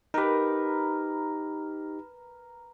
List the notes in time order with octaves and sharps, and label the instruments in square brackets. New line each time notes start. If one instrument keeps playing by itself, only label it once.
[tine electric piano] D#4 G4 [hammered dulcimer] A#4 B4